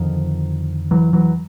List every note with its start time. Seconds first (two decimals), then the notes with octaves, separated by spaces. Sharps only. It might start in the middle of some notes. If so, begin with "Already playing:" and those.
Already playing: F2 D3 D#3 F3
0.91 E3 F#3
1.13 E3 F#3